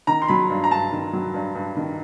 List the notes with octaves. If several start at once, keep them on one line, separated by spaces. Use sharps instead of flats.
D#3 A#5
C6
F#3 B5
G2
A#5
G2 A5
D#3
F#3
G2
G2
D#3